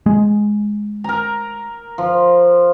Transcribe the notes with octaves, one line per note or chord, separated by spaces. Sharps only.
G#3
A#4 A#5
F3